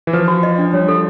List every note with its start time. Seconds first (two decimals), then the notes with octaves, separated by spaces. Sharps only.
0.07 E3
0.13 F3 B4
0.28 F#4
0.43 D#5
0.58 D4
0.73 G3 C#5
0.88 A4